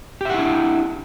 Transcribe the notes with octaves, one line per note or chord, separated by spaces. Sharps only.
D4 E4 G4 E5 F#5